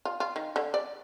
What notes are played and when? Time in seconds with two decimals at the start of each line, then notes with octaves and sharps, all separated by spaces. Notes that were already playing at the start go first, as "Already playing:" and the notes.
0.05 F4
0.20 F4
0.36 D#3
0.56 D3
0.74 D5